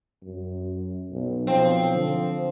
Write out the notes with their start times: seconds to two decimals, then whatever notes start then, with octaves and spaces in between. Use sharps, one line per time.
0.23 F#2
1.11 B1
1.47 B1 F3 C4
1.94 D3 F3